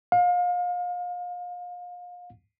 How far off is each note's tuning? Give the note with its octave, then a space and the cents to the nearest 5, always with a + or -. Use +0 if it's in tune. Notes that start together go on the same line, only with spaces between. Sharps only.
F5 +35